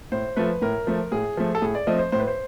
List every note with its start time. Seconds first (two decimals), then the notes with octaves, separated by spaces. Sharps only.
0.12 A2 C5
0.36 F3 A3 B4
0.62 A2 A#4
0.87 F3 A3
1.12 A2 G#4
1.37 F3 A3
1.55 A4
1.62 A2 G#4
1.75 D5
1.87 F3 A3 C4 D#5
1.99 C5
2.12 A2 C5
2.20 B4
2.27 C5